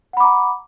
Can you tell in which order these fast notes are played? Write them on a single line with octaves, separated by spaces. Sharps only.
F#5 B5 D6 A#5